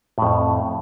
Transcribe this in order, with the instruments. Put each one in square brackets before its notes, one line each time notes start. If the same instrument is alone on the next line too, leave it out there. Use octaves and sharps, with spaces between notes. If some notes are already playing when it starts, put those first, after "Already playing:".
[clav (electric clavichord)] F2 A2